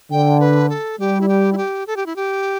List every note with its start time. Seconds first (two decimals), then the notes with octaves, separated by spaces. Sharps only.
0.11 D3 G5
0.40 B4
0.70 A4
1.00 G3 G4
1.21 E4
1.29 G4
1.53 E4
1.57 G4
1.87 A4
1.97 G4
2.06 E4
2.16 G4